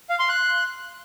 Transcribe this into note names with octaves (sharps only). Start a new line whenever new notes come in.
F5
C6
F#6